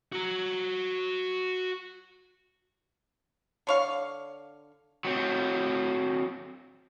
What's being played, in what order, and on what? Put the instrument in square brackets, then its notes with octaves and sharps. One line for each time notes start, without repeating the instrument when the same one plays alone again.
[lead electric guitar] F#4 A#5
[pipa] D3 C#5 F5
[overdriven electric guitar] F#3 C4